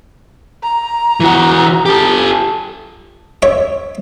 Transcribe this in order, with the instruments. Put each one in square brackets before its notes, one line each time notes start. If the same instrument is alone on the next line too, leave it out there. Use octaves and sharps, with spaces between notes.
[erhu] A#5
[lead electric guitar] E3 F#4
G4 A4
[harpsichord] C#5 E5